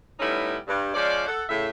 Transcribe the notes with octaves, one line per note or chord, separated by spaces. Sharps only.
G3 A3 B3 C#4 D#4 E4
G2
F3 G#3 C#4 D5
A4 F#5
A2 C#3 E5